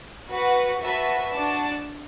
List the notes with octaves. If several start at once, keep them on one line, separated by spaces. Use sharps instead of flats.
F#4 B4 F#5
F#4 B4 E5 A5
D4 F#4 D5 A5